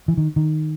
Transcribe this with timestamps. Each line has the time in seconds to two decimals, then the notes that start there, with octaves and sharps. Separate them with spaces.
0.08 E3
0.17 D#3
0.36 D#3